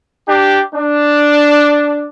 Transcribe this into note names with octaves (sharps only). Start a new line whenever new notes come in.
D4 G4
D4